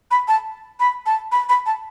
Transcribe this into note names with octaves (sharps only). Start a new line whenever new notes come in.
B5
A5
B5
A5
B5
B5
A5